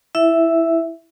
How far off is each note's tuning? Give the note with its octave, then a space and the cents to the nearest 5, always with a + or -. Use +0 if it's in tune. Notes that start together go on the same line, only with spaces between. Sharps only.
E4 +0 E5 +0